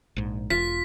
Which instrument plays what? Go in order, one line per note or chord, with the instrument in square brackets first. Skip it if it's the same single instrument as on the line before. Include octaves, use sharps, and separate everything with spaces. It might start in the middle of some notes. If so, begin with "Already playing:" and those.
[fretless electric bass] A#1 G#2
[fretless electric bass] E1 [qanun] F4 [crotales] B6